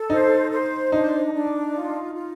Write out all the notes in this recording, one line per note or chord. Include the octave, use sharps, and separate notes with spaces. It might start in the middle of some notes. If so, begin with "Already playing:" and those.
Already playing: A4
D#4 C5
C5
D4 D#4
D4
F4
F4